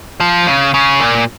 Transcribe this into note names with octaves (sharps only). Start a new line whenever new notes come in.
F3
C#3
C#3
A#2